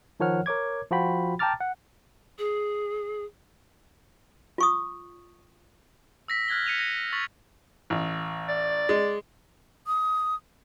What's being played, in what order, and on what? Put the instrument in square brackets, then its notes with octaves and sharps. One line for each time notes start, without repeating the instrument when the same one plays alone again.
[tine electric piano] D#3 F3 A#4 C#5 F#5 F6
A#4 C#5 D6 G#6
F3 F4 F#4 G5 B5
G5 A5 A#5 D6 F6 A6
F#5
[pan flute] G#4
[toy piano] F4 C#6 D#6
[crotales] E6 A#6 B6
F6 F#6 G#6 A#6 G7
B6 C#7 D#7 F7
A#6 D#7
C#6 A6 B6 F#7
[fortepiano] A1
[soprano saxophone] D5
[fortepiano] G#3
[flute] D#6